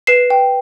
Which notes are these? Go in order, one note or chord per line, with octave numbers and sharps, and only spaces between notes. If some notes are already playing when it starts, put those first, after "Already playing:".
B4 C7 E7
G5